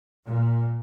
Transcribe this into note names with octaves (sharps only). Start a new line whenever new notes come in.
A#2